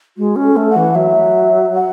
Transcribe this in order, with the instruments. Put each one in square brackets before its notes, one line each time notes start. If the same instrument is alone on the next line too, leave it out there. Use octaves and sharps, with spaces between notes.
[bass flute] G#3 [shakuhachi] F#4
[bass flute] C#4
[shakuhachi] A4
[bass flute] A3
[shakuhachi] F#5
[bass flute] E3
[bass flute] F#3 [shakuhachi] E5
[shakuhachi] F#5